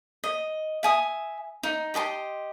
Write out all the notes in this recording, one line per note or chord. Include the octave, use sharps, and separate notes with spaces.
D#5
E5 G#5 D#6
D#4
G4 D#5 A5 C6